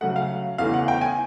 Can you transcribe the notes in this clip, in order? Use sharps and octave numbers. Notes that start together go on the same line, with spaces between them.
C#3 F#3 A3 F#5
F5
E2 C#3 E3 A3 F5
F#5
G5
G#5